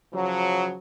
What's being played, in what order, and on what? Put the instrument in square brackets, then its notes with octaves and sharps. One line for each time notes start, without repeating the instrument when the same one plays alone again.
[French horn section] C#3 F3 F#3